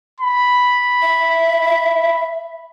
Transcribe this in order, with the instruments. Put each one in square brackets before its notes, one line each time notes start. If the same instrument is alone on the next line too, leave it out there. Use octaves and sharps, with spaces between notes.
[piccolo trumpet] B5
[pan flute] E5